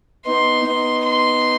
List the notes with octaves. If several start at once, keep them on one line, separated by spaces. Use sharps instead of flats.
B3 D#4 C6
B3 D#4
C6